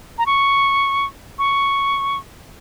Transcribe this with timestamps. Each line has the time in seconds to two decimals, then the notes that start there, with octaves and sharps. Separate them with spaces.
0.18 A#5
0.26 C#6
1.39 C#6